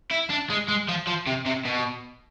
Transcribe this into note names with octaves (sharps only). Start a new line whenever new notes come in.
E4
D4
G#3
G#3
F3
F3
C3
C3
B2